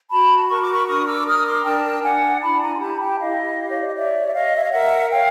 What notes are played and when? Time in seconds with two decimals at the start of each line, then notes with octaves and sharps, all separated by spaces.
0.10 F#4 A5 B5
0.49 A#4 C#6
0.61 D6
0.72 B5 C#6
0.87 D4 C#6 D#6
1.06 D6 E6
1.26 A#4 D#6 F6
1.45 C6 D6
1.64 D4 G5 A5
2.03 D4 F#5 G#5
2.41 E4 A5 B5
2.61 G#5 A#5
2.76 C6
2.80 G4 A5 B5
2.99 G5 A5
3.18 E4 D#5 F5
3.57 G4
3.70 C#5
3.79 D5
3.88 D#5
3.95 C#5 D5 E5
4.27 E5
4.34 C#5 D#5 F5
4.56 E5
4.65 F5
4.72 A#4 E5 F#5
5.11 C#5 F5 G5